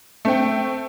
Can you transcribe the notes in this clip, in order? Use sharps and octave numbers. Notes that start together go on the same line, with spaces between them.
A3 C4 G5